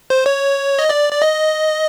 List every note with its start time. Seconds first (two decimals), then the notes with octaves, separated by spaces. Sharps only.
0.10 C5
0.26 C#5
0.79 D#5
0.89 D5
1.13 D5
1.22 D#5